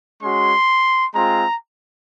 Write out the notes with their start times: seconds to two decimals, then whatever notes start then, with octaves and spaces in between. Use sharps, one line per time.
0.22 G#3 C#4 F#4 C6
1.13 G#3 C4 F4 A#5